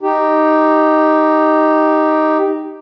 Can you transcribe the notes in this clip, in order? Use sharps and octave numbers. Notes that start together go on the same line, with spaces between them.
D#4 G4